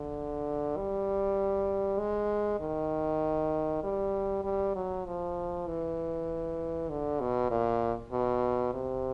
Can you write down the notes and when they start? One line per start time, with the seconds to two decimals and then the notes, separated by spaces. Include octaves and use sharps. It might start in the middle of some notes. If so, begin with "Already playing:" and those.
Already playing: D3
0.77 G3
1.99 G#3
2.60 D#3
3.84 G3
4.44 G3
4.76 F#3
5.06 F3
5.67 E3
6.90 D3
7.21 B2
7.51 A#2
8.12 B2
8.74 C3